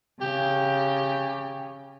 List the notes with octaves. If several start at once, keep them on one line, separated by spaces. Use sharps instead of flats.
C#3 G4